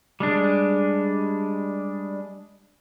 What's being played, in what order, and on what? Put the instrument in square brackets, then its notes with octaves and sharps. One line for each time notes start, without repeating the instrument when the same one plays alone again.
[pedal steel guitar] G3 G#3 D4